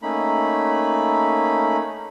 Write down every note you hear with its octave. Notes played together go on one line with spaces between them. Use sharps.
A3 A#3 C#4 D#4 B5